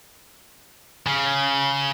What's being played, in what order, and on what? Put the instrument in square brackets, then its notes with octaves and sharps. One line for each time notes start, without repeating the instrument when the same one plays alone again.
[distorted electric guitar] C#3